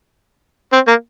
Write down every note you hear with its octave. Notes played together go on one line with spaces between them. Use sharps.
C4
A#3